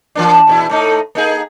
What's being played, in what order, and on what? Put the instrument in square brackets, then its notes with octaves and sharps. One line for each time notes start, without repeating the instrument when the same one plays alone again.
[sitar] E3 A#3 D4
E2 A#2 E4
A2 A3 D#4
A#3 D#4 G#4